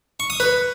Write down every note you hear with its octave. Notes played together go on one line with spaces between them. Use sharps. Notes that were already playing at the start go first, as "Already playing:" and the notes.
C#6
D#6
B4